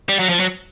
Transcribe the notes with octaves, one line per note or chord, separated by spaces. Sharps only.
G3
F#3
F3
F#3